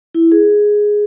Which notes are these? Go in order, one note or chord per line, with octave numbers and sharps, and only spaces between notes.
E4
G#4